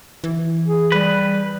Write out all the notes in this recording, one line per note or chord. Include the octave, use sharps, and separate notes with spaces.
E3
G#4
G3 B4